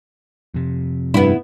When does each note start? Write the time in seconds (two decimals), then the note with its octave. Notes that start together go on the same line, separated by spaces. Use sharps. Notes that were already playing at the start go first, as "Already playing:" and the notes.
0.54 F2 C3
1.14 G2 B3 E4